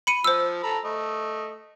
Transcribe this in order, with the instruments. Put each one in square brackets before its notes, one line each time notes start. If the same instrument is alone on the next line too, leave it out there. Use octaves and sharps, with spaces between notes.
[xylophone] B5 C#7 D#7
[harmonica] F3 [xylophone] C5 E6
[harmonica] A4 A#5 B5
A3 D#5